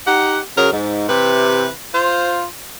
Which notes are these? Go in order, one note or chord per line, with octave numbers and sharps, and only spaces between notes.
D#4 G4 F#5
C#3 F#3 G#4 A#4
G#2
C3 E3 G4 B4
F4 C5